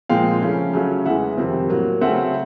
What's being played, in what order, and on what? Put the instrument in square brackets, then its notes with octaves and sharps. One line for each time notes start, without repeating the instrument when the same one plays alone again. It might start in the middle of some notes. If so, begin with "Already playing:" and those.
[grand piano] A#2 F3 G#3 C4 F5 G5
C#3 F3 A3 C#4
C#3 F#3 A3 C#4
E2 C#3 E3 G#3 E5 F#5
F2 C3 D#3 G3 C4
A2 F#3 A#3
C#3 F#3 A3 C4 E5 F#5